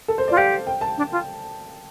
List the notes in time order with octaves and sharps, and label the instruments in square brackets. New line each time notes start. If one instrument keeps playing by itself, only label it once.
[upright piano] A4
C5
D5
[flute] F4
[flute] G4 [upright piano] F5
[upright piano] G5
A5
[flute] D4
F4